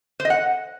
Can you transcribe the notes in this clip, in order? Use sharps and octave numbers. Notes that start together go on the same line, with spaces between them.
C5
D#5
F#5